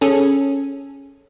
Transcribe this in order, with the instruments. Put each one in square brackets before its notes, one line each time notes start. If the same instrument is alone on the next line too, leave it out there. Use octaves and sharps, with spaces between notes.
[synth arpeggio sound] C#4 G#4 A4